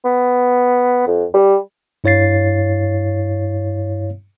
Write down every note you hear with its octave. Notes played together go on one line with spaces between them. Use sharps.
B3
F2
G3
G2 E4 C#5 F5 A6 C7